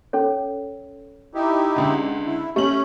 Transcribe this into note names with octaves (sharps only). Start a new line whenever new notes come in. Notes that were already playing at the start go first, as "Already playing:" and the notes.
C#4 A4 C#5
D#4 E4 G4
C#2 D3
E4
A3 C#4 G4 F#7